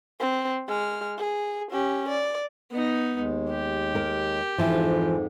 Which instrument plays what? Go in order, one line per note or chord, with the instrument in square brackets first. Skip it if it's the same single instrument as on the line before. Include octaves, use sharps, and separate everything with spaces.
[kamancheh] C4
G#3 F6
G#4
C#4 G4
D5
[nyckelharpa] B3 D#4
[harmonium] D#2 G#3
[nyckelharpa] G4
[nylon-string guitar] A#4
[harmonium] F2 G#2 [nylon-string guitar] E3 F3